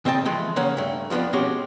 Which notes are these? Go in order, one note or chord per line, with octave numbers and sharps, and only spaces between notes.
C#3 C4 D#5 G5 A5
E3 F3 G#3 A3
C#3 A#3 C#4 F#5
G2 A3
F2 F3 G#3 B3 D4
B2 G#3 C4 C#4 F#4 G4